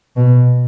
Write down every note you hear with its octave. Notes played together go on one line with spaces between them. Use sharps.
B2